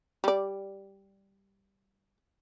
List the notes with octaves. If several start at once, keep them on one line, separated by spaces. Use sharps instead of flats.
G3 D5